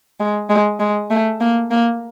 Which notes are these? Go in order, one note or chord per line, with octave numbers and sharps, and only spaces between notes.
G#3
G#3
G#3
A3
A#3
A#3